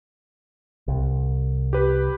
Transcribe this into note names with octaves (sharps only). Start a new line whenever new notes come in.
C2
G4 B4